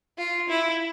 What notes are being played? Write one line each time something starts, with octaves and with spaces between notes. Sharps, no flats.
F4
E4